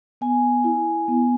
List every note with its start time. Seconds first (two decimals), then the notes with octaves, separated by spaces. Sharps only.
0.21 B3 G#5
0.64 E4
1.08 B3